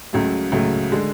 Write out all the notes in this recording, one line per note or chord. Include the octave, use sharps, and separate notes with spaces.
C#2 C#3 F#3 A3
C#2 C#3 F#3 A3
D3 G#3